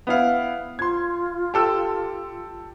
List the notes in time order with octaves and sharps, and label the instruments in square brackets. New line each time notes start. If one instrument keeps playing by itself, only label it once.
[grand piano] B3 E4 F5
[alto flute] F4 [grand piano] C6 G#6
[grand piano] G4 A4 E6